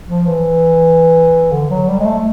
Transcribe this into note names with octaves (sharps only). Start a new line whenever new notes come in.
F3
E3
D3
F#3
G3
G#3
A3